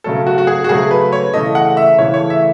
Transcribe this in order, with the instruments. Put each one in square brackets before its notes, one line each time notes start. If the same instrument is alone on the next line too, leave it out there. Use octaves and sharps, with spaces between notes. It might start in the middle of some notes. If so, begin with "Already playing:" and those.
[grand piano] C#3 F#3 A3 A4
F#4
F#4
G#4
F#4
C#3 F#3 A3 G#4
B4
C#5
C#3 E3 A3 D#5
F#5
E5
C#3 E3 A3 C#5
C#5
E5